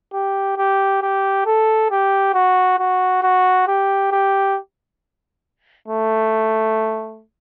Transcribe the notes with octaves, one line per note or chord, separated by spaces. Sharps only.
G4
G4
G4
A4
G4
F#4
F#4
F#4
G4
G4
A3